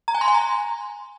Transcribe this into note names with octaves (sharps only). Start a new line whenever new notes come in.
A#5
G#5
C6
G#5
A#5